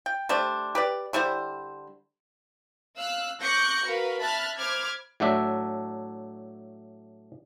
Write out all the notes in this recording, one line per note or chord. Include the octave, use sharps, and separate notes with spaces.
G5
G3 A3 D4 C5
G4 B4 D5
D3 G3 E4 C5
F5 E6 F#6
C#6 D6 F#6 G6 A#6 C#7
F#4 A#4 B4 F5
E5 A5 B5 F6 F#6 A6
C5 B5 D6 F6 G#6
A2 F#3 A3 D4 E5